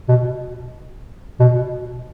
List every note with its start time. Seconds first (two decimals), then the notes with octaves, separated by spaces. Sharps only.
0.09 B2
1.40 B2